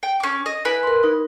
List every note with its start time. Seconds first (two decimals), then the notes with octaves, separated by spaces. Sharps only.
0.03 G5
0.20 C#4 D6
0.46 D#5
0.65 E4 B4 G#5
0.83 A#4 C6
1.03 D#4 A#4